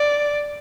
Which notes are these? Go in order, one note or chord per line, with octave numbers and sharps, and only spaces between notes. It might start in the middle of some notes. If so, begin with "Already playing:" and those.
Already playing: D5